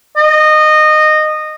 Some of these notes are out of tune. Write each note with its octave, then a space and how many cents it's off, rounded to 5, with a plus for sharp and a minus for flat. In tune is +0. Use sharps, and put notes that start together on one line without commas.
D#5 -20